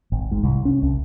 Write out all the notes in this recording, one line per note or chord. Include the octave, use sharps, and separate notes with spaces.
G#1
G#2
C2
C#4
C2